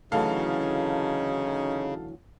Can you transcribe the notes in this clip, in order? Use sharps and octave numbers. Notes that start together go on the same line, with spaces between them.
D2 C#3 E3 F#3 C#4 D#4 A4 F5